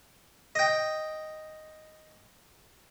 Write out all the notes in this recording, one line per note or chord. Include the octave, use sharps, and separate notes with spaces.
D#5 G5